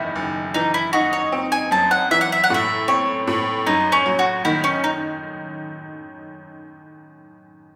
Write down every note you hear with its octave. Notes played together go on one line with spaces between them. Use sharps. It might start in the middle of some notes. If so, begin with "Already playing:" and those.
Already playing: F#1 E2 D#3 E4
F#1
E3 D#4
E4
D#4 F#4
C#5
C4
G#5
F#2 A5
F#5
E3 E5
F#5
E5
F#5
A2 E5
C4 C#5
A2
F#2 D#4
C#4
F#3
F#4
D#3 E4
C#4
D#4